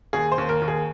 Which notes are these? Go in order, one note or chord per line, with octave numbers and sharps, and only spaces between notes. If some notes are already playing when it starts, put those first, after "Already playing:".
D#2 G#4
C5
D#2
A#4
D#2
G#4